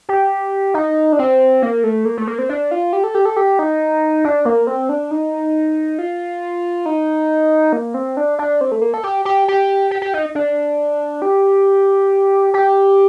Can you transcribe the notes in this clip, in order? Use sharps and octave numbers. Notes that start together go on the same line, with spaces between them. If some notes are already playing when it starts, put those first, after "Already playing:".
G4
D#4
D4
C4
A#3
A3
A#3
A3
A#3
C4
D4
F4
G4
A4
G4
A4
G4
D#4
D4
A#3
C4
D4
D#4
F4
D#4
A#3
C4
D4
D4
C4
A3
A#3
A4
G4
G4
G4
G4
G4
D#4
D4
G4
G4